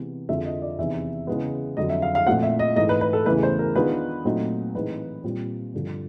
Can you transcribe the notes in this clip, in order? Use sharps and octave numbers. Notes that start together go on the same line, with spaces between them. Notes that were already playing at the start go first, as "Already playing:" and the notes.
Already playing: C3 E3 G#3 B3
F2 D3 F3 G#3 E5
D#5
D5
E2 C3 D#3 E5
C#3 E3 G#3 B3
F2 D3 F#3 D#5
E5
F5
F5
A#2 F3 A3 C4 F#5
E5
D#5
G#2 E3 A3 D#5
B4
B4
A4
E2 C#3 E3 A3 B4
C5
A#4
D#3 G#3 B3 D4 F4 B4
A#2 F#3 A3 C4 D#4
A2 E3 G#3 C4 D#4 B4
A#2 G3 C4 F4
G2 D3 F3